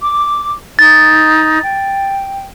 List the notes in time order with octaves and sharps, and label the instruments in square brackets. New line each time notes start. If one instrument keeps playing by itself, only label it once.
[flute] D6
[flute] D#4 [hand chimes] A6
[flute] G5